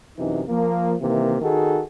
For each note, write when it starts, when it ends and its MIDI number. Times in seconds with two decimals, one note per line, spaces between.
0.18 0.42 42
0.18 0.42 48
0.18 0.42 52
0.18 0.42 63
0.48 0.94 53
0.48 0.94 58
1.01 1.36 48
1.01 1.36 51
1.01 1.36 52
1.01 1.36 58
1.42 1.82 51
1.42 1.82 63
1.42 1.82 66
1.42 1.82 68
1.42 1.82 69